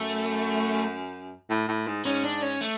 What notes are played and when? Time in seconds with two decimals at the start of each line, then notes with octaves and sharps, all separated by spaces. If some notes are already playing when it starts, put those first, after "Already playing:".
Already playing: F#2 A3
1.50 A2
1.68 A2
1.87 G#2
2.05 G#2 C#4
2.24 D4
2.42 C#4
2.61 A3